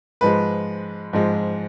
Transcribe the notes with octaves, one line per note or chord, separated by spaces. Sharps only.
G#2 F3 G#3 B4
G#2 F3 G#3